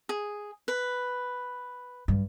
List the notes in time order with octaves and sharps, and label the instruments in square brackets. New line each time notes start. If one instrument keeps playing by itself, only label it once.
[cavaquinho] G#4
B4
[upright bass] G2